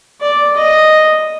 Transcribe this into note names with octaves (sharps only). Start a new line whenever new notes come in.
D5
D#5